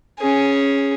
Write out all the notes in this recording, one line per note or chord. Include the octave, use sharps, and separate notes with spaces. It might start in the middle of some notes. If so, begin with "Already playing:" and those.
C#4 G#4